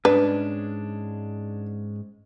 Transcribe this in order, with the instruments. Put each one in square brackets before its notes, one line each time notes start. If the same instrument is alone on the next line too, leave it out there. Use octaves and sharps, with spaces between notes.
[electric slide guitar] G#2 G#3 C#4 [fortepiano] D4 [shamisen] B4